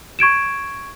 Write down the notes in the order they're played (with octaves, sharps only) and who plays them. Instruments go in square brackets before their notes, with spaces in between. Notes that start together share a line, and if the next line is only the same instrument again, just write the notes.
[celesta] C#6 G#6 D7 E7